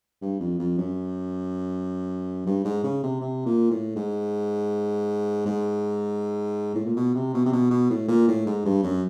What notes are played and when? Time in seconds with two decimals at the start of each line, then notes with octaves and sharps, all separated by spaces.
0.22 G2
0.40 F2
0.59 F2
0.78 F#2
2.46 G2
2.64 G#2
2.83 C#3
3.03 C3
3.21 C3
3.46 A#2
3.71 A2
3.96 G#2
5.46 G#2
6.75 A2
6.85 A#2
6.96 B2
7.15 C3
7.34 B2
7.46 C3
7.52 B2
7.70 B2
7.90 A2
8.08 A#2
8.28 A2
8.46 G#2
8.65 G2
8.83 F#2